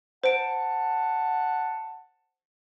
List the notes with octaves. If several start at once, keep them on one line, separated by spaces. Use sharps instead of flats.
C5 F#5 A5 D7